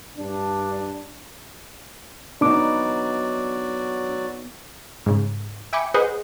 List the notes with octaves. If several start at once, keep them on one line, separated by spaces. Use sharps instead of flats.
G2 D4
F#3 B3 D4 D#4 F#4 D5 D6
G#2 C#3
E5 G5 G#5 B5 D6 C#7
G#4 B4 C5 D#5 F#5